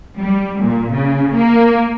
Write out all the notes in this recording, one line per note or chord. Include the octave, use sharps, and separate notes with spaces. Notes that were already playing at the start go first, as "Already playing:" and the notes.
G3
A#2
C#3
A#3